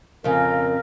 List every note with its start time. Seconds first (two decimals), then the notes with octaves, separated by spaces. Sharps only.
0.24 F2 C#3 A#4